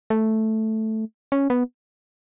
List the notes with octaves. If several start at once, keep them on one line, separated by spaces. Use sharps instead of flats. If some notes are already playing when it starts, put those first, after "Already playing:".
A3
C#4
B3